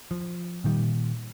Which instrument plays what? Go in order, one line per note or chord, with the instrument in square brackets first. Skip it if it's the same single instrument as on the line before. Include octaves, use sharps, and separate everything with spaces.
[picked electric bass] F3
A#2 D#3 G3